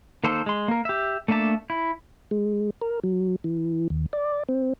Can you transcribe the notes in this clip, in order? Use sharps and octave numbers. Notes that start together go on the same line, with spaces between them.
D#3 A#3 A4 C5
G#3 C6
A#3 A#4
G4 E5
A3 A#3 D4 E5 A5
E4
G#3
A#4
F#3
E3
D#2
D5
C4